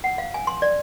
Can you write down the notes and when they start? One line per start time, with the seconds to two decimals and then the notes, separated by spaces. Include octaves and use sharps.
0.04 F#5
0.18 F5
0.34 G#5
0.47 C6
0.62 D5